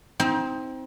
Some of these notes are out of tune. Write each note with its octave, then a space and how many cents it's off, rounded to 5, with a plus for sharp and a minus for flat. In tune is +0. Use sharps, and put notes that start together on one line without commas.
C4 +0 D#4 +30